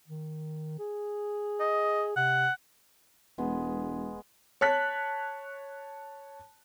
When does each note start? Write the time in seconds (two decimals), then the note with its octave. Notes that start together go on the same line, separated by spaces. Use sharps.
0.08 D#3
0.79 G#4
1.60 D#5
2.17 C3 F#5
3.38 E1 G#3 B3
4.61 C#5 A5 F#6 B6